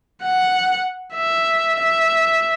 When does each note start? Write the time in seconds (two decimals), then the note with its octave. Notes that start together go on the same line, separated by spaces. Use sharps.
0.23 F#5
1.14 E5
1.81 E5